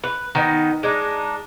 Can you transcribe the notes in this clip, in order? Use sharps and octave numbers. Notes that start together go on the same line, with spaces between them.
B4
D#3 B3 D#4
G#3 D4 D#4